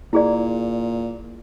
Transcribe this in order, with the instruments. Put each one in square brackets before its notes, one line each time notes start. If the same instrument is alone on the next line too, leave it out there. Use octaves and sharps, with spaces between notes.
[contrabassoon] A#2 [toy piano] E4 G#4 D5